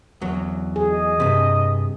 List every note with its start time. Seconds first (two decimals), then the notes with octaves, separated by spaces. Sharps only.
0.21 E2 F#3
0.76 G#4
0.93 D#5
1.20 G2 C3